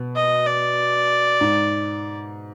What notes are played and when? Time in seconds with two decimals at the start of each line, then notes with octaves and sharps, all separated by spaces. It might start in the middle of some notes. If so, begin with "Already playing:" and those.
Already playing: B2
0.16 D#5
0.47 D5
1.41 G#2